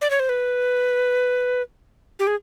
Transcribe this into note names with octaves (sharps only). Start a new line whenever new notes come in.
D5
C#5
C5
B4
G4
G#4